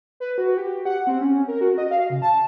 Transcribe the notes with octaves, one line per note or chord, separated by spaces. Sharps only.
B4
F#4
G4
F#5
C4
C#4
A#4
F#4
D#5
F5
C#3
A5